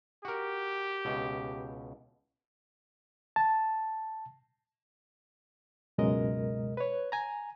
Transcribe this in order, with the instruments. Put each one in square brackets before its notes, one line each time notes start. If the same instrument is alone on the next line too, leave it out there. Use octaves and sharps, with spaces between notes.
[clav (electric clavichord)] F#4 A#4 [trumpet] G4
[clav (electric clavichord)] C#2 B2
[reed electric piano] A5
C#2 F#2 B2 G#3 A#4 D#5
B4 C#5
G#5 A#5